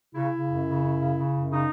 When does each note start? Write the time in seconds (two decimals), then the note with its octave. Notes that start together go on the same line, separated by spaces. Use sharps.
0.14 C#3 E4
0.31 C#3
0.48 F#2
0.65 C#3
0.82 F#2
0.99 C#3
1.15 C#3
1.33 F#2
1.49 C#3 D#4